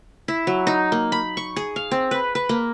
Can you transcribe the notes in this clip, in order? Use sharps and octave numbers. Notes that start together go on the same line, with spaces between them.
E4
F#3
D#4
A#3
B5
C#6
G#4
F5
C4
B4
B4
A#3